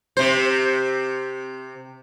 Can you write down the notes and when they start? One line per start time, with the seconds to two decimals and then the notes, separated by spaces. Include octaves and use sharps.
0.17 C3 C5